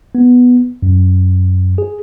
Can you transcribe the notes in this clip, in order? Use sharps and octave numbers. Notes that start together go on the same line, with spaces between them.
B3
F#2
G#4